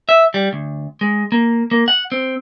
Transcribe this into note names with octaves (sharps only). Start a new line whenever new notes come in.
E5
G3
D2
G#3
A#3
A#3
F#5
C4